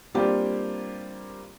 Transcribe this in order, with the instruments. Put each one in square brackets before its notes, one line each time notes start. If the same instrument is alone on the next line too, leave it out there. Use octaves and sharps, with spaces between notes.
[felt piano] G3 A#3 C4 D4 F4 G4